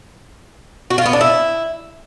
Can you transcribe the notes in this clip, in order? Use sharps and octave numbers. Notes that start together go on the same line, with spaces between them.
F#4
F4
B3
D4
E4